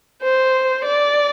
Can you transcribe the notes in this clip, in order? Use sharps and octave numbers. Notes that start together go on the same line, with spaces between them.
C5
D5